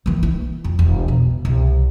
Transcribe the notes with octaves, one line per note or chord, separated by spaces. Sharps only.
E3 A#3
E4
F2
E1
B2
C2